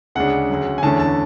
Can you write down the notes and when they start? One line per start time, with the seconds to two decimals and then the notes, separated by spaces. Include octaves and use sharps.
0.15 D2 C#3 G#3 D4 F#5
0.49 D2 C#3 F#3
0.78 G#5
0.83 E2 D3 A3 C#4 A5
1.00 A5